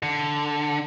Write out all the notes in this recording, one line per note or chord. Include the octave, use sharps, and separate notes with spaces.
D3